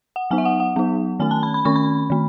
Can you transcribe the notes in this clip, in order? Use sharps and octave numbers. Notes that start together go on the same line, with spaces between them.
F#5
F#3 B3 D#4 G#5
E5
F#5
F#5
F#3 B3 D#4
D#3 A3 C#4 G#5
A5
B5
B5
D#3 A3 C#4 C#6
B5
D#3 A3